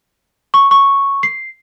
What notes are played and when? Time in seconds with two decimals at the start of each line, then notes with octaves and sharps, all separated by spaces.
0.54 C#6
0.71 C#6
1.23 C7